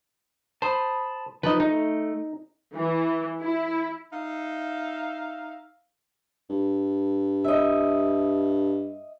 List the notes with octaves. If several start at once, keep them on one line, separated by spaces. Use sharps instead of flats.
C5 A5 B5 D#6
F3 D#4 B4 D#5
A3 D#4
E3
E4
D#4 E5 F5
G2
D#5 E5